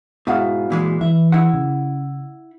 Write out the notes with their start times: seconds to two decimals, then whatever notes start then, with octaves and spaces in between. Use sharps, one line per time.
0.27 G#2 B2 E4 F#4 F5
0.70 A#2 E3 G#3
1.01 E3 E5
1.32 E4 F#5
1.54 C#3